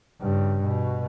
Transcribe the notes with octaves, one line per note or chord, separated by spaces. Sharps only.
G2 C#3
B2